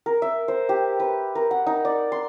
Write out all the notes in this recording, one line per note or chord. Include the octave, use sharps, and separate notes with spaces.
A#4
E5
C5
G4
B4
A#4
F#5
D#4
D5
C6